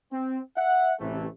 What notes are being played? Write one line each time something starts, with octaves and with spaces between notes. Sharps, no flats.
C4
E5 F#5
A1 C3 E3 A3